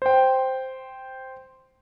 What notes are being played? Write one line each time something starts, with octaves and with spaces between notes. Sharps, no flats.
C5 G5